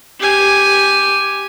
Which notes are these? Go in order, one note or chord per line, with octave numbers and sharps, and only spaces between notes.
G4 G#5